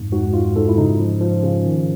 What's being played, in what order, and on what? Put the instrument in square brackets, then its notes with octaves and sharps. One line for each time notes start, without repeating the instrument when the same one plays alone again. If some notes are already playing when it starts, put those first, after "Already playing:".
Already playing: [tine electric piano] F2 G#2
G#2 F#4
G#2 F4
G#2 A4
E4
C#3 D#4
F3
F3
C#3
D#3